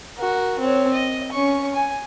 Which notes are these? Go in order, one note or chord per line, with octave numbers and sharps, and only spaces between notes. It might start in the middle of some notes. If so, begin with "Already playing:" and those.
F#4 A#4
C4 C#5
D#5
C#4 C#6
G#5